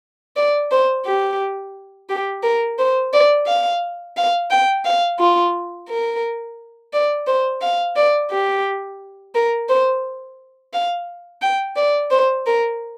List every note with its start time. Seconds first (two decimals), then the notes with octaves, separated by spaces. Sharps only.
0.36 D5
0.71 C5
1.06 G4
2.10 G4
2.43 A#4
2.79 C5
3.13 D5
3.47 F5
4.17 F5
4.51 G5
4.85 F5
5.19 F4
5.89 A#4
6.93 D5
7.27 C5
7.62 F5
7.96 D5
8.31 G4
9.35 A#4
9.69 C5
10.74 F5
11.42 G5
11.77 D5
12.11 C5
12.46 A#4